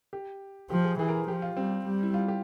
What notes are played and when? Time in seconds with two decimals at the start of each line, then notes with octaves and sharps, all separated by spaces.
0.13 G4
0.70 F3 G4
0.85 G#4
0.99 E3 G#4
1.08 A#4
1.28 F3 G4
1.42 F4
1.56 G3 C4
1.85 G3
2.03 E4
2.14 F4
2.28 G4